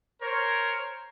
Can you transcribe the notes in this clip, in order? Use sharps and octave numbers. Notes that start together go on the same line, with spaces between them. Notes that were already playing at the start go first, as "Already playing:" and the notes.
A#4 C5 C#5